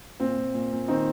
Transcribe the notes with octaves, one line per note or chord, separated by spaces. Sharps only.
A#2 C4
A#2
A#2
A#2
D#3 C4 D#4